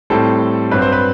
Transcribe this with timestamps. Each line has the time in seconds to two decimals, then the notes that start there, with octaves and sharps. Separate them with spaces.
0.10 A2 G3 C4 A4
0.71 G2 F#3 C4 B4
0.82 C5
0.92 B4